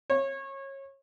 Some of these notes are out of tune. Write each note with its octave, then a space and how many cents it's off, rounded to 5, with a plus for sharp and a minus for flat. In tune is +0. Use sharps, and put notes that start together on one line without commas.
C#5 -25